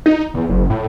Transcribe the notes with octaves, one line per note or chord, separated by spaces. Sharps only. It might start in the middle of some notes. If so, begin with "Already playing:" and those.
D#4
E2
F#1
A2